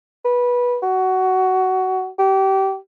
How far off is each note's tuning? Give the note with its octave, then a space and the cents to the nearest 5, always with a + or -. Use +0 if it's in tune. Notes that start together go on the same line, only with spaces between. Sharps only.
B4 -15
F#4 +15
G4 -25